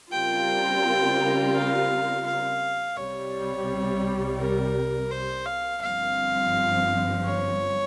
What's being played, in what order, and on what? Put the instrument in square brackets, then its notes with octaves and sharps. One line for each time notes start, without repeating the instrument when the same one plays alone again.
[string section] C#3 G3 C4 F4 A#4 [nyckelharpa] G5
[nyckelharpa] F5
F5
[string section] C2 C3 G3 [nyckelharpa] C#5
[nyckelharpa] A#4
C5
F5
[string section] G1 G2 F3 C4 [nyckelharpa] F5
[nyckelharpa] C#5